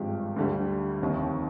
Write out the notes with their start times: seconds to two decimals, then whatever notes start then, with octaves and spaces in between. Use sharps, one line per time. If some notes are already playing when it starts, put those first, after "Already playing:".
Already playing: G#1 G2 F3 G#3 G4
0.36 D2 D3 G3
1.01 F1 D#2 D#3